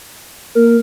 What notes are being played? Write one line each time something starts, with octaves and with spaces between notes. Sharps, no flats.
A#3 A#4